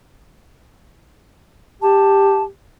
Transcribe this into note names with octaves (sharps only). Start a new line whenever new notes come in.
G4 A5